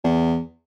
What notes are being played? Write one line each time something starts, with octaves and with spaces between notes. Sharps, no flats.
E2